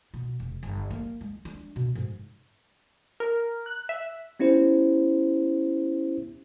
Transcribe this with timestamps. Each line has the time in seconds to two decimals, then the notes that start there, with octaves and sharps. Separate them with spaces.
0.14 B2
0.40 F1
0.63 G1
0.91 A#3
1.21 G#3
1.45 D4
1.76 B2
1.95 G#2
3.20 A#4
3.66 F#6
3.89 E5
4.40 B3 C#4 E4 G4 C5